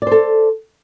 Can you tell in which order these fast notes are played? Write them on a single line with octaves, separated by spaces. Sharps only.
D5 C5 A4